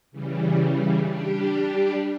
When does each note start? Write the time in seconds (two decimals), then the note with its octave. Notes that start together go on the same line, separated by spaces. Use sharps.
0.12 C#3 E3 G3
1.04 G3 D4 G4